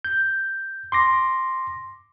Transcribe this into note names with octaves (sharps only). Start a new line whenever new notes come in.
G6
C6 D6 A#6